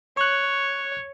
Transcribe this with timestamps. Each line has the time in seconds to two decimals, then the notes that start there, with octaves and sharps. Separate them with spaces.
0.17 C#5 C#6 F#6